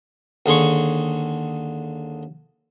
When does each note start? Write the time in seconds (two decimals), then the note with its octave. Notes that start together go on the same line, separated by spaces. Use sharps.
0.46 D#2 D3 G#4 C6 C#6